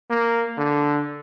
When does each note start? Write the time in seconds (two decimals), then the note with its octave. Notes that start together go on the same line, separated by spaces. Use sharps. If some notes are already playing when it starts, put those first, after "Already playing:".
0.10 A#3
0.58 D3